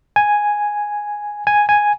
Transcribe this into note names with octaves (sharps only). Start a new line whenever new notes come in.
G#5
G#5
G#5